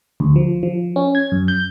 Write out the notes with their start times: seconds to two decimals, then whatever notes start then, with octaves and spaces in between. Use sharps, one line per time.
0.20 D2
0.36 F3
0.63 F3
0.96 C#4
1.15 G#6
1.32 F#2
1.48 G6